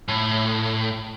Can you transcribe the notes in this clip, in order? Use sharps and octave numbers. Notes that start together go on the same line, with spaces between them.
A2